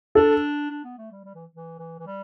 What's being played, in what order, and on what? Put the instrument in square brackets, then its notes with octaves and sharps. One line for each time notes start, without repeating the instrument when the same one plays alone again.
[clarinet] D4 [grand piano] A4
[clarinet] D4
B3
A3
G3
G3
E3
E3
E3
E3
G3